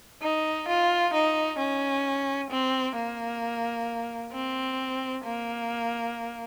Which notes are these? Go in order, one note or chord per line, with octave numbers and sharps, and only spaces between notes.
D#4
F4
D#4
C#4
C4
A#3
C4
A#3